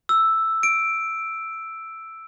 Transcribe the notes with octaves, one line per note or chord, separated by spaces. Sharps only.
E6
D7